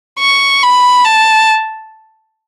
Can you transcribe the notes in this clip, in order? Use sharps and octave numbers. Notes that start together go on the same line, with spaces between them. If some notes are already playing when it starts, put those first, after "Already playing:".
C#6
B5
A5